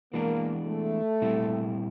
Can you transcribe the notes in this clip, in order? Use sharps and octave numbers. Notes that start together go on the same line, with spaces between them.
E3 G#3 A#3 B3 D4
A3
A#2 G3 C4 E4